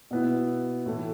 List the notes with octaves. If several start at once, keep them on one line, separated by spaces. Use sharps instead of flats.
B2 B3 E4
A2 E3 A3 E4